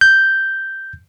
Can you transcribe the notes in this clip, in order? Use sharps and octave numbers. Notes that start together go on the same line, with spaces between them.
G6